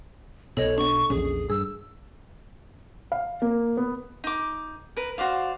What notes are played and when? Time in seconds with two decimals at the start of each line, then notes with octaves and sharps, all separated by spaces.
0.57 B1 B2 A4 C#5 D#5
0.78 B3 D4 C#6
1.10 A#1 E2 C#4 G#4
1.50 G2 G#4 E6
3.12 F5
3.42 A#3
3.77 B3
4.24 D#4 D6
4.97 A#4 B4
5.18 F#4 C5 D5 F5